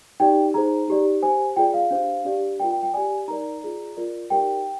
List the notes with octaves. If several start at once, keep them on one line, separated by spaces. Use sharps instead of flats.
D#4 G4 D5 G5
D#4 G#4 C5 A#5
D#4 G4 D5
G4 C5 G#5
F4 G#4 D5 G5
F5
D4 G4 C5
D4 G4 D5
F4 A#4 D5 G5
G5
G5
G4 D5 G#5
D#4 A#4 D5 A#5
F4 G#4 D5
F4 A#4 D5
D#4 G4 A#4 D5 G5